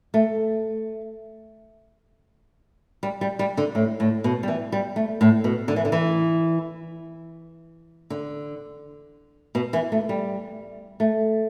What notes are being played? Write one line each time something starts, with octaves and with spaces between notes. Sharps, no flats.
A3
G3
G3
G3
D3
A2
A2
B2
G3
E3
G3
A3
A2
B2
D3
E3
D3
E3
D3
B2
E3
A3
G3
A3